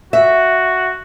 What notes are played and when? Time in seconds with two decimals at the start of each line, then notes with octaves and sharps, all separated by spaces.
0.13 F#4 E5